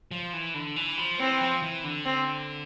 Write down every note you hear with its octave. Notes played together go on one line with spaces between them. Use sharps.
F3
E3
D3
E3
F3
E3 C4
F3
E3
D3
C4